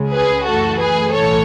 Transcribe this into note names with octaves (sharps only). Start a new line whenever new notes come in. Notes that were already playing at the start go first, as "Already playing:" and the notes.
Already playing: C#2 C#3 G#3
G#4 B4
F#2 E3 A3 F#4 A4
G#4 B4
B1 A2 E3 A4 C#5